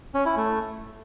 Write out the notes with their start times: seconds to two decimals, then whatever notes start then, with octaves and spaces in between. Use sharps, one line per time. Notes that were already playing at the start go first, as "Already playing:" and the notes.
0.14 C#4
0.26 E4
0.37 A3